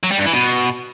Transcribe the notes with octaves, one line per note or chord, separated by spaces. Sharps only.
F#3
G3
G2
E3
B2